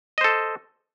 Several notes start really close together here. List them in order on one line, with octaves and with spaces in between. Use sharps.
D#5 C5 A4